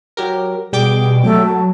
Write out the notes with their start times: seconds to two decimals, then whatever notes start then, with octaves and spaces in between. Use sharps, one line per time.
0.17 F#3 G4 A#4
0.73 B2 G3 G#4 G5 D6
1.24 F#3 A3
1.46 A5